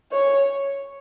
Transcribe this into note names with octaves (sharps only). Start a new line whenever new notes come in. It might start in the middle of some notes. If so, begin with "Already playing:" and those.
C#5